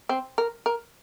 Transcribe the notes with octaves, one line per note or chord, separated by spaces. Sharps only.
C4
A#4
A#4